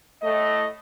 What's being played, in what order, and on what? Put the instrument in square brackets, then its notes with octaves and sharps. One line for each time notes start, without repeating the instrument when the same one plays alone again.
[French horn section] A2 A3 D#5